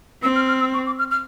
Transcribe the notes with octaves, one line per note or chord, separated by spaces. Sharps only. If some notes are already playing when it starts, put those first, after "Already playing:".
C4 E6
F6
F6
E6
C#6
D6
F6
F6